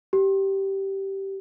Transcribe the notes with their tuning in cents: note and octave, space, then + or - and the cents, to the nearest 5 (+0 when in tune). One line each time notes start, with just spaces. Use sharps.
G4 -15